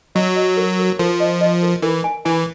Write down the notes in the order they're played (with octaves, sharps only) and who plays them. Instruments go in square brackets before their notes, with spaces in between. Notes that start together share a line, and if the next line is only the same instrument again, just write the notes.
[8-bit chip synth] F#3 [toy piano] D#5
[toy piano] D#5
A#4
A#4
[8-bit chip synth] F3 [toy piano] A#4
[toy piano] D#5
D#5
A#4
[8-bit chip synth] E3 [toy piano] A#4
[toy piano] G#5
[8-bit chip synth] E3 [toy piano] G#5